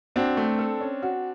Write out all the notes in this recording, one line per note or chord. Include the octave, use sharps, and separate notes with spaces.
C4 D4 F#4
A3
A4
C#4
F#4